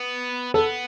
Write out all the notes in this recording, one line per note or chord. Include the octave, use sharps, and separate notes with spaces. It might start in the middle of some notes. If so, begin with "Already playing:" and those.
Already playing: B3
B3 A4